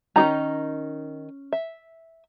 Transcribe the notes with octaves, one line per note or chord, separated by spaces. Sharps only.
D#3 C#4 D#4 G#4 A#5
E5